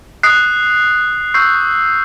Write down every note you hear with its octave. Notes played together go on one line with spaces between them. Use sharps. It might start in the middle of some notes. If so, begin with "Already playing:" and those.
D#6 F#6 C7
C#6 E6 G6 C7